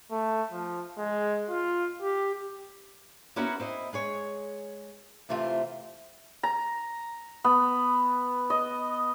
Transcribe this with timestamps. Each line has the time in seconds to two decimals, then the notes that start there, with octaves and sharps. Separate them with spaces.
0.11 A3
0.52 F3
0.98 G#3
1.49 F4
2.01 G4
3.36 A#3 B3 C#4 E4 F#4 A#4
3.60 C4 E4 D#5
3.93 G#3 G#4 C#5
5.29 C3 E3 A3 C4 F4
6.43 A#5
7.44 B3
8.50 D#5